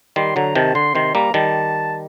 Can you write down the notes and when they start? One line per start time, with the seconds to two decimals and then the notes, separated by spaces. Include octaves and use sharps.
0.16 D#3 G3 C6
0.36 D3 F#3 A#5
0.55 C3 D#3 A5
0.75 D3 C6
0.95 C3 D#3 C6
1.14 G3 A#3 A#5
1.34 D#3 G3 A5